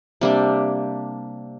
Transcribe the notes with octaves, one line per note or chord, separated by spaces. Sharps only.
C3 G3 A#3 D4